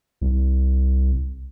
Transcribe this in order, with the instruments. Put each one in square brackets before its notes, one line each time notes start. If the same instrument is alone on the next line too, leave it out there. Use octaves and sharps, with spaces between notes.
[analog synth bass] C2